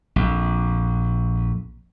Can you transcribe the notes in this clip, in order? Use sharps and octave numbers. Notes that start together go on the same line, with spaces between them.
A#1 F2